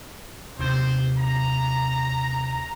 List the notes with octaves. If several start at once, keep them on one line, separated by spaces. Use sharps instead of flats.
D#2 C3 C5
A#5